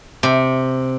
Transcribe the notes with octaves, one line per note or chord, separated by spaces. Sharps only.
C3